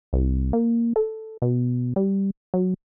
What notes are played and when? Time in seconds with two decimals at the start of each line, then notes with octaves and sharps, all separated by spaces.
0.13 C2
0.53 A#3
0.96 A4
1.42 B2
1.96 G3
2.54 F#3